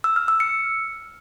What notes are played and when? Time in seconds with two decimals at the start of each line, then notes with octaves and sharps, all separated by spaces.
0.04 E6
0.16 F6
0.28 E6
0.40 C#7